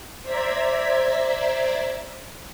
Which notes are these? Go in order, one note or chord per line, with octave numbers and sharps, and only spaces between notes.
C5 D5 E5 A#5 G#6 B6